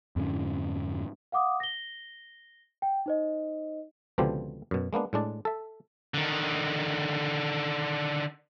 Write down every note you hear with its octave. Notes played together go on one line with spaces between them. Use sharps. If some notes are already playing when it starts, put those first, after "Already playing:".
F2 G#2 D3 C#4
F5 F#5 D6 D#6
A#6 G7
G5
D#4 C5 D#5
C#2 B2 D3 F3 C4 G4
F#2 B2
G#3 A#3 B3 D4
A2 G#3 D4 D5
A4 E5
D3 D#3